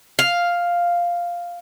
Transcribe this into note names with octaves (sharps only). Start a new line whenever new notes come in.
F5